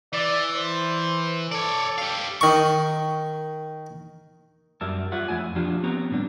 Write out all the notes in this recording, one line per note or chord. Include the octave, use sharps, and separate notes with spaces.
E3 D5
C5
A4 C#5 D5
G4 F5
D#3 C#6
F#2 G3 A#4 D5 E5 A5
F4 C#5 D5 E5 F#5
F2 A3 E4 G#5
F3 D4 F4 G4
B3 C4 C#5 A#5
A2 D3 G3 D4